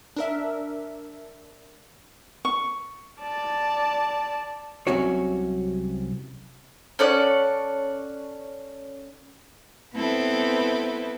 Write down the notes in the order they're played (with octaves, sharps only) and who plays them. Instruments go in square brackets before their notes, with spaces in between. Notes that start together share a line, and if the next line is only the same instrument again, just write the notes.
[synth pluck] D4 A#4 E5
[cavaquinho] C#6
[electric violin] D5 A5
[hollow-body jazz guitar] C2 C3 F#3 C#4 F#4 C#5
[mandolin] C#4 A4 D5 F#5
[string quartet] B3 C4 E4 A4 B4